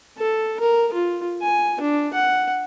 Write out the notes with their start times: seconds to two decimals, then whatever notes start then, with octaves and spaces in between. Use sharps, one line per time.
0.18 A4
0.60 A#4
0.93 F4
1.42 G#5
1.81 D4
2.14 F#5